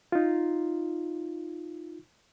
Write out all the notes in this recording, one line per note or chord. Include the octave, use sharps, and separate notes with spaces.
D#4 F4